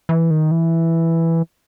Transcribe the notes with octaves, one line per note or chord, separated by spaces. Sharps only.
E3
D#3
E3